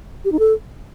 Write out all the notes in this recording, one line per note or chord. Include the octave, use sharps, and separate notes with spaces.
G4
D#4
A4